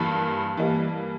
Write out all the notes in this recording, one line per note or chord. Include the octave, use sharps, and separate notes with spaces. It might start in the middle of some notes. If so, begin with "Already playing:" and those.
Already playing: G2 E3 G3 A#3 A5 B5
E3 G3 A#3